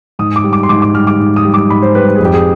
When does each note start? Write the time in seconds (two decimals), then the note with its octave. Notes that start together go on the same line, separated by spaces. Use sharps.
0.19 G#2 D#6
0.36 D6
0.44 G3
0.53 D6
0.63 C6
0.69 G#2 D6
0.82 D6
0.95 G3 F6
1.07 D6
1.20 G#2
1.36 D#6
1.45 G3
1.54 D6
1.70 G#2 B5
1.82 C5
1.95 G3 B4
2.08 B4
2.16 G#4
2.20 F2 G4
2.34 G#4